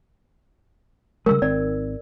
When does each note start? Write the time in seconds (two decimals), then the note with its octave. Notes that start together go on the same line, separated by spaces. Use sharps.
1.26 C#3 G3 G#3 A#4 E6
1.42 G#1 D#3 C4 D5